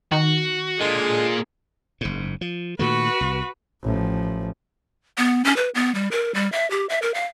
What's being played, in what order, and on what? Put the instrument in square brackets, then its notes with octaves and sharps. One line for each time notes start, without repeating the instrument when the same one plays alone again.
[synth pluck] D#3 [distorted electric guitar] F#4
[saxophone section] D3 G#3 [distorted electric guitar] A#3 F4 [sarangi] G#4
[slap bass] F#1 G#2
F3
[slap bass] A#2 D#3 A3 [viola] F#4 B4
[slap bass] C2
[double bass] A1 F3
[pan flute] B3
C#4
B4
B3
G3
A#4
G3
E5
G4
E5
A#4
F5